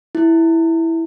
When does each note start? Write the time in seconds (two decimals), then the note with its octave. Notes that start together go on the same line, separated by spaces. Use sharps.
0.15 E4